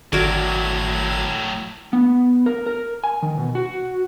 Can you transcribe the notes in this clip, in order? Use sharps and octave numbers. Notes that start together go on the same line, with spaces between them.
G#1 A2 F#3 F#4 A#4 D5 G#6
B3
A#4
A#4
G#5
D#3
B2
F#4